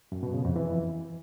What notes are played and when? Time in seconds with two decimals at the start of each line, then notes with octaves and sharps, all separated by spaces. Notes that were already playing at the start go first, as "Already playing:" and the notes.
0.12 F#2
0.23 B2
0.34 C#3
0.45 F2
0.56 E3